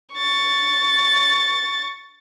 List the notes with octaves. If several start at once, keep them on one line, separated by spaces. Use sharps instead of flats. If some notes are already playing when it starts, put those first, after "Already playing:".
C#6 A6